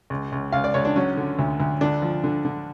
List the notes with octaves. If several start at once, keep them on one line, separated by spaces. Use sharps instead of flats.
C#2
C#2
C#2 F5
D5
C#2 C#5
D4
F#3 C#4
D3
D2
D2
D3 D4
F3
D3
D3